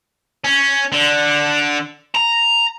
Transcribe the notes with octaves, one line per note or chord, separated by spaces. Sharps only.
C#4
D3
A#5